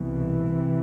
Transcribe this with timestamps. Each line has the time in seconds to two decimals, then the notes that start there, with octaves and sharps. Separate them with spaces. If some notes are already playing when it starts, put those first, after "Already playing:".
Already playing: C2 B2 E3
0.52 C3